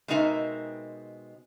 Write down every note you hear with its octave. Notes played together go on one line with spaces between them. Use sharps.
B2 G#3 C4 D#4 A#4 E5